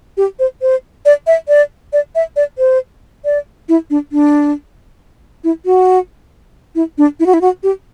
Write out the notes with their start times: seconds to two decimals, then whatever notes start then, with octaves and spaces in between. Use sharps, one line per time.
0.17 G4
0.39 C5
0.62 C5
1.05 D5
1.27 E5
1.48 D5
1.93 D5
2.15 E5
2.36 D5
2.58 C5
3.25 D5
3.69 E4
3.90 D4
4.12 D4
5.44 E4
5.65 F#4
6.75 E4
6.98 D4
7.20 E4
7.26 F#4
7.34 E4
7.41 F#4
7.63 G4